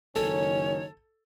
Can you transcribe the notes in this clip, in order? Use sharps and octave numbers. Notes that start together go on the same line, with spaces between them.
F#1 C#2 D#3 C#4 A4 C#5